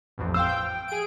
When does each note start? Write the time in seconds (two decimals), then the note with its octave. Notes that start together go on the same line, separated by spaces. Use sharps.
0.18 A1 F2
0.34 C5 F5 G5 E6
0.48 G5
0.88 G#4 D7